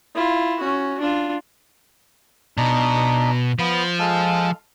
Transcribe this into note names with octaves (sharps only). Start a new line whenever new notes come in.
E4 F4
C#4 F#4
D4 F4
B2 D4 D#4
F3 B3
G#3 A4 F5